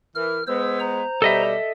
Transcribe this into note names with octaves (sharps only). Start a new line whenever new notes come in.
E3 A#4 F6
G#3 B3 C5 E6
C5 A#5
B2 G3 A4 D#5 E5